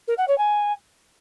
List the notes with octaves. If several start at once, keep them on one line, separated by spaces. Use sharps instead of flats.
A#4
F#5
C#5
G#5